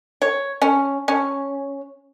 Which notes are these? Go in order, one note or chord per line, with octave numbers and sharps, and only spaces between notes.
C#5
C#4
C#4